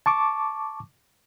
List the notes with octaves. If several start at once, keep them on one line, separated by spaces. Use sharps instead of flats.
A5 C#6 D6